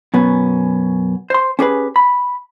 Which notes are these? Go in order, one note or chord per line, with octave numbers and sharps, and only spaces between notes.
F#2 B2 B3 C#4
C5 C6
C#4 G4 G#4 B4
B5